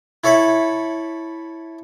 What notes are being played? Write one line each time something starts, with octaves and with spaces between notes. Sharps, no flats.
E4 A4 C#5 E5 B5